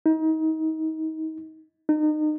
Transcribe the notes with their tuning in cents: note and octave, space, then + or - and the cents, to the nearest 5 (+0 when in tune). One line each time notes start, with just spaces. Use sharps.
D#4 +30
D#4 -30